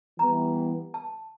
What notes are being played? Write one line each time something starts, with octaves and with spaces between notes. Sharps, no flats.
E3 G3 B3 A#5
A5